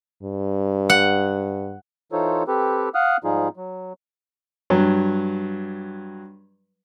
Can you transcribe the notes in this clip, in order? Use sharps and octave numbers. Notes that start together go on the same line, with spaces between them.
G2
F#5
E3 D#4 F4 A4 C5 C#5
C4 G4 A4 B4
F5 F#5 D#6 F6 F#6
G#2 F3 G3 D#4 F4 G#4
F#3
G2 F#3